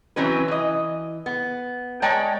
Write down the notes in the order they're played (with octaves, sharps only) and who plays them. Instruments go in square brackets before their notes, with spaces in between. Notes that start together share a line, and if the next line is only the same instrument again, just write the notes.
[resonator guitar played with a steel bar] E3 F#3 C4 C#4 B4
E3 D#5
B3
G#3 C#5 D5 G5 A5 A#5